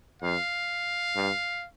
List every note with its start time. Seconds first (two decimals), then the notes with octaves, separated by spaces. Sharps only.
0.22 F2 F5
1.16 G2